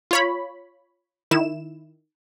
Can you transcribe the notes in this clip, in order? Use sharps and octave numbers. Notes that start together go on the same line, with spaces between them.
F4 C#5 B5
D#3 E4 E7